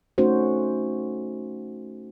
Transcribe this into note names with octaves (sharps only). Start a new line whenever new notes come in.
A3 C#4 D#4 F#4 C5